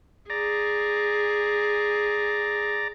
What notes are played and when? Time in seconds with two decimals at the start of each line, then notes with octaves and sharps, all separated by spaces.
0.30 G#4 D5 A#5